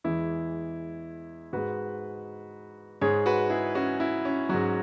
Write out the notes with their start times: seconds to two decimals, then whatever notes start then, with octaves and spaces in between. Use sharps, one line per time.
0.04 E2 E3 G#3 E4
1.53 G#2 G#3 F#4 B4
3.01 G#2 G#3 G#4 C#5
3.26 F#4 B4
3.50 E4 G#4
3.75 C#4 F#4
4.00 E4
4.25 C#4
4.49 G#2 F#3 C#4 F#4